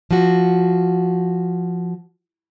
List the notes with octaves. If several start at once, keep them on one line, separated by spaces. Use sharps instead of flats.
F3 F#4